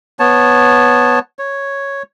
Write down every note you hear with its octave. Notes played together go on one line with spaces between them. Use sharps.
B3 C#5 A5
C#5